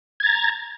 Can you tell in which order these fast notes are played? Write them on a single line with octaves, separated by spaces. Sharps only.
G#6 A6 A#5